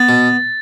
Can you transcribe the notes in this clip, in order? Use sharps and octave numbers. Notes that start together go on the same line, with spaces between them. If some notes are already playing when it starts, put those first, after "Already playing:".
Already playing: B3 A6
B2